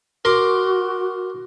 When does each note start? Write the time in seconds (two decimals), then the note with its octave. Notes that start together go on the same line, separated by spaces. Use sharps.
0.25 F#4 A#4 C6 D6